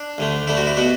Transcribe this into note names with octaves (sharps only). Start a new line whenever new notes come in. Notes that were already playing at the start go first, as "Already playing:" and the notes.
Already playing: D4
D2 D3 A3
D2 D3 A3 E4
F#4
E4
B2 B3 F#4